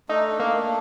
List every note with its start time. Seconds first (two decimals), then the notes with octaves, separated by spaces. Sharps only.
0.09 A3 D4 D#4 A4
0.40 A#3